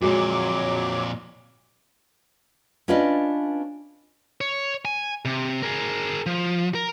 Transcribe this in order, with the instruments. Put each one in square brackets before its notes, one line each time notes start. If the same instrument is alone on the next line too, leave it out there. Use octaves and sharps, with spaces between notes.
[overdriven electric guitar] F2 A#2 [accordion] F#3 D6 [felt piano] G#3 F#4
[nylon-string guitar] C#4 D4 F4 B4 D5 D#5
[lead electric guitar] C#5
G#5
C3
G#4 A#4
F3
A#4